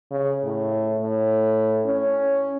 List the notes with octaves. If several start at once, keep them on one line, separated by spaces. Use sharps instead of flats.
C#3
A2
A2
C#4